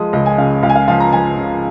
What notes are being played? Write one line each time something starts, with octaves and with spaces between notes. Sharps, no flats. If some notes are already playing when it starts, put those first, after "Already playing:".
Already playing: F3 G#3 D#6
C#2 D#5
G#5
C#3 F5
C#2 F5
G#5
F5
F3 F5
A#5
F3 G#5
C#3